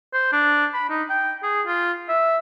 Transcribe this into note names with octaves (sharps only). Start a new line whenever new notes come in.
C5
D4
B5
D#4
G5
G#4
F4
E5